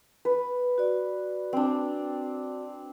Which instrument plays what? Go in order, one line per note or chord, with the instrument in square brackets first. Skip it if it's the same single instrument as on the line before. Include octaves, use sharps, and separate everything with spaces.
[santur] B4
[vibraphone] F#4 D5
[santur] C4 D4